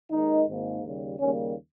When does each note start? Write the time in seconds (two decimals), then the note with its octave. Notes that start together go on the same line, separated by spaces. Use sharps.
0.10 D#2 D#3 G#3 D#4
0.47 G#1 G#2 D#3 A#3
0.82 D#2 C#3 G3
1.18 D#2 C#3 G3 A#3 C#4